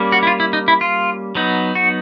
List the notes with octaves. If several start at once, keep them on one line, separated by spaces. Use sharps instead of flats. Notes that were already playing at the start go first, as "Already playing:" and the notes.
Already playing: G3 A#3 C#4
F#4
E4
F4
E4
D#4
E4
F4
F#3 B3 D#4
F#4